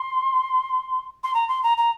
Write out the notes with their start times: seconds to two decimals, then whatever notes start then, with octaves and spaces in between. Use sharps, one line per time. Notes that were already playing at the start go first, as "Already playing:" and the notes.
Already playing: C6
1.24 C6
1.34 A#5
1.49 C6
1.63 A#5
1.78 A#5